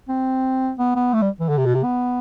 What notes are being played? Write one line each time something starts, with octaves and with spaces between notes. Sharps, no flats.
C4
B3
B3
A3
G3
E3
D3
C3
B2
C3
B3